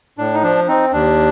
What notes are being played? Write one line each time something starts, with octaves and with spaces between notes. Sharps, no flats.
A2 D4
D#4
F3 D4
C4 D#4
D#2 D4